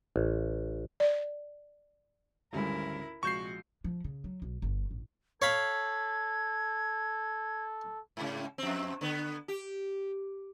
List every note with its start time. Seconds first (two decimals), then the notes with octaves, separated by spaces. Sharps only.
0.16 A1
1.00 D5
2.53 G#1 D2 G3 G#3 C#4 E4 A4 A#4
3.23 A#1 C3 G#3 F#4 C#6 G6 C7 E7
3.84 F3
4.04 C#3
4.24 F#3
4.42 B1
4.62 G1
4.91 A1
5.42 A4 C#5 F5 B5 G#6
8.17 G#2 C#3
8.58 F2 C4
9.01 D3 B3
9.48 G4